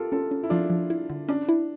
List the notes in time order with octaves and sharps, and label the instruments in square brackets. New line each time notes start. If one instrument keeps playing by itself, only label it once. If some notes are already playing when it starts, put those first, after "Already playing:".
Already playing: [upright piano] F4 G4 A4 A#4
[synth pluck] C#4 [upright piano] F4 A4
[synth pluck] C#4
[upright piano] E4
[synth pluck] F3 [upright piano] D4 F4
[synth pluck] F3
E4
D3
[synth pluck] C#4 [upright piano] D4
[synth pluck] E4